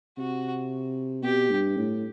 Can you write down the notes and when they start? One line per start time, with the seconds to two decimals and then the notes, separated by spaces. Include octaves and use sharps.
0.18 C3 F#4
1.23 B2 G4
1.50 G2
1.78 A2